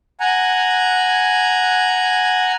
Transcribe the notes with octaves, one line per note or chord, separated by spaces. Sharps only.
F#5 G#5 A#5